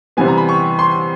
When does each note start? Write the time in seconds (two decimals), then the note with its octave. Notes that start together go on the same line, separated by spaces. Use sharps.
0.17 C3 E3 G3 B3 G#5
0.28 A#5
0.38 B5
0.49 C#6
0.79 C6